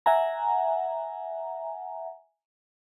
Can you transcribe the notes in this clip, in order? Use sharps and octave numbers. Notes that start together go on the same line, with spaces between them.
E5 F#5 G#5 A#5